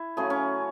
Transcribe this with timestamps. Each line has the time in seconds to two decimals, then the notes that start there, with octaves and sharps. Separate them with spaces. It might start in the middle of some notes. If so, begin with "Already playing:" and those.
Already playing: E4
0.17 C#3 F#3 A3 G#4
0.30 C#4